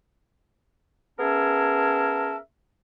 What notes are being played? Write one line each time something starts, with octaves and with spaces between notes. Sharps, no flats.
B3 C#4 G#4 A#4 E5 A5